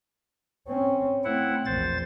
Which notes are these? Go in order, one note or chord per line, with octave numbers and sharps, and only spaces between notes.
C4 C#4
A3 C4 E4 F#5
A#1 E2 C5 A6